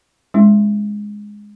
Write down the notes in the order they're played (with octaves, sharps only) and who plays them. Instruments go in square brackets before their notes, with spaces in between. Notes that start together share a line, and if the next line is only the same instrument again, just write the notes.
[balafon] G#3 C4 C#4 E4